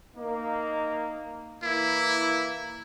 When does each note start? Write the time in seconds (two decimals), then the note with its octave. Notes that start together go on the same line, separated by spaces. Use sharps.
0.16 A#3 D#4
1.63 E3 A#3 E4